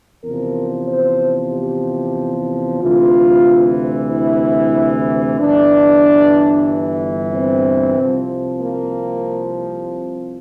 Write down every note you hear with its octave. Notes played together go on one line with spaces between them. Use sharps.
E2 C3 F3 A#4
C5
G4
D2 C3 E3 F4
E4
G1 G2 E3 D4
C4
C2 C3 F3
A#3